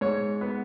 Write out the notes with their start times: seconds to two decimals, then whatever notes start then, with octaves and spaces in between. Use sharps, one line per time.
0.01 G#2 C#5
0.41 B3